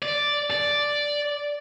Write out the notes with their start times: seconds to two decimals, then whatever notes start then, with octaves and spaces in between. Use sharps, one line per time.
0.02 D5
0.51 D5